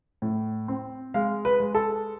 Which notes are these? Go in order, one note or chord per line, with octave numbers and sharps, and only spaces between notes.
A2
C4
G#3 F5
B4
G#3
A4